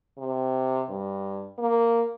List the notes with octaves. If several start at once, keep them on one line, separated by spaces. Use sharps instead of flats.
C3
G2
A#3